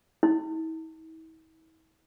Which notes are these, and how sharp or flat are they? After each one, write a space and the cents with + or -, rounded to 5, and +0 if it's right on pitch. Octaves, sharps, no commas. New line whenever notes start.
E4 -45